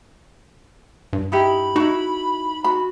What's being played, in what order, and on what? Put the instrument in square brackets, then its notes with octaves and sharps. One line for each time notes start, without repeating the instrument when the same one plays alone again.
[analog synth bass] G2
[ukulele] D#4 E4 G4 [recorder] B5
[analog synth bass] D#4 [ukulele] E4 F#4
[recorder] F#4 [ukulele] B5